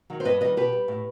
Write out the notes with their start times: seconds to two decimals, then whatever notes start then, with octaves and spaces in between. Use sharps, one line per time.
0.10 D#3 F#3
0.20 C5
0.25 G2 B4 D#5
0.41 D#3 G3 B4 D#5
0.57 B2 G4 B4
0.73 G3
0.88 A2